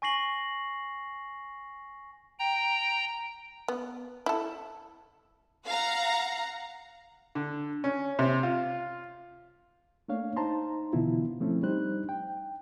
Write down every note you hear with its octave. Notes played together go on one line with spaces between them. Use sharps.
G#5 C#6 A#6 C7 F#7
G5 A#5
B3
E4 A4
F5 F#5 A#5
D3
C#4
C3
F4
A3 A#3 D4 C#5 F5
D#4 C5 A5 A#5 C6
B2 D3 E3 B3 E4 F4
F3 A3 C4 C#4 E4
G3 D4 D#4 C5 F#6
G5